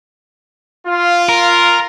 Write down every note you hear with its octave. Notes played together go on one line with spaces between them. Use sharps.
F4
A#4